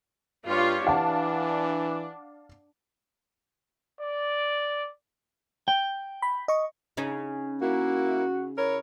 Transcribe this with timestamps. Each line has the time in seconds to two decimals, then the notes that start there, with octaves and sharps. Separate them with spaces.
0.46 G2 F4 G4 C#5
0.87 E3 D4 F5 F#5 A5
4.01 D5
5.68 G5
6.22 B5
6.48 D#5 C#6
6.97 C#3 C#4 D#4
7.62 A#3 E4 F#4
8.58 E4 A#4 C#5